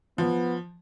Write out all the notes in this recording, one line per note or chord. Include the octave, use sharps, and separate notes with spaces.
F3 B3